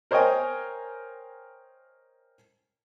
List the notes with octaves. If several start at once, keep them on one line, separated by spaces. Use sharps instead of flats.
A#4 C5 C#5 D#5 G5 G#5